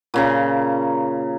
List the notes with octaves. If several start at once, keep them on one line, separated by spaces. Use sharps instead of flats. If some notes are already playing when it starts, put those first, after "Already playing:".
A#2 C#3 A#5